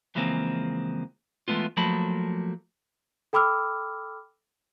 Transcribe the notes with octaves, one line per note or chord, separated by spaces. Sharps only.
C#2 E3 F3 G#3 A#3 C4
E3 G#3 A3 B3 F4
F3 F#3 A3 A#3 A4 B5
A4 G5 B5 D6 E6 F6